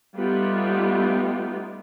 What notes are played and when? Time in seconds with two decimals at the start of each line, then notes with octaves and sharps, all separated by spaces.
0.16 G3 A3 B3 D#4 F4 G4